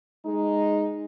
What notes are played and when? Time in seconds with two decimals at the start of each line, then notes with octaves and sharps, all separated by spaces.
0.25 G#3 D#4